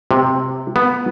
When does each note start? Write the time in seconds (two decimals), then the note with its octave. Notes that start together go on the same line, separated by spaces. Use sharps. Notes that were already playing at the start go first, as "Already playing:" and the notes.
0.11 C3
0.76 B3